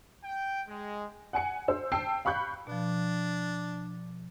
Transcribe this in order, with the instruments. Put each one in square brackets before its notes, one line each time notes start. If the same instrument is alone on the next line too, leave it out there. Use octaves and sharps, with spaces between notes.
[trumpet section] G5
G#3
[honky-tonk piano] F#5 G#5 C#7
C5 E6
G5 A5 E6 C7
F5 B5 C#6 F#6 G6
[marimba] B2 F3 [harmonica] D4